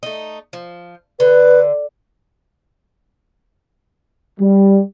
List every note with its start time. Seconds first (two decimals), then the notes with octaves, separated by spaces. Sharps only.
0.03 A3 D#4
0.53 F3
1.20 D3 B4
4.40 G3